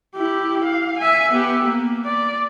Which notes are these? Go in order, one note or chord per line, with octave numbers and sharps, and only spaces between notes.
E4 G4
F5
E5 G#5
B3 G4
A#3
D5